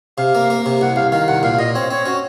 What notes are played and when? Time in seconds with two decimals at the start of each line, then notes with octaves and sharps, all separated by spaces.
0.18 C3 F5
0.35 A#3
0.50 A#3
0.66 C3
0.81 C2 F#5
0.96 C2 F5
1.12 D#3 F5
1.28 C2 F#5
1.43 A#2 F5
1.54 F5
1.59 A#2 D#5
1.74 C4 C#5
1.90 C4 C#5
2.06 C#4 F#4